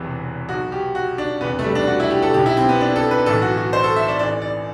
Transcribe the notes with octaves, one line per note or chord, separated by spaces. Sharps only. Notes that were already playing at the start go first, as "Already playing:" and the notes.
Already playing: E1 E2 C3 E3
B1 B2 F#4
G4
F#4
D4
E1 E2 C3 B3
A3
G3
D4
F#4
E4
G4
A4
B1 B2 G4
E4
C4
B3
D4
A4
B4
B1 A2 E3 A4
F#4
F#4
C5
A4
E5
D5
A1 A2 E3 D5
D5